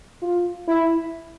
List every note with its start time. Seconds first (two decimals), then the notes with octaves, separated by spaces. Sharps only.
0.22 F4
0.68 E4